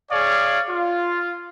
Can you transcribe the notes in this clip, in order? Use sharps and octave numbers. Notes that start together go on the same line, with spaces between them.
G#4 C#5 D5 F5
F4